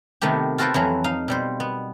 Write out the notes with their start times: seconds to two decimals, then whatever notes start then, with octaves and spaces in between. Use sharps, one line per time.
0.21 C3 D#3 A3 B3 G4
0.58 F4 F#4 A4 B4 C5 G5
0.74 F2 E3 F#3
1.04 D#4 F5
1.28 B2 G3 C5
1.60 B3